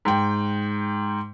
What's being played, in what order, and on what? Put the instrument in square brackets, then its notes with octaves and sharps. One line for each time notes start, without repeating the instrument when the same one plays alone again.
[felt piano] G#2 G5